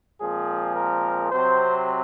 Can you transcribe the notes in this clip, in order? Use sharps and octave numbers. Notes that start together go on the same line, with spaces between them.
A#2 F3 G#3 C4 G#4
A#4
C3 F#3 C4 C5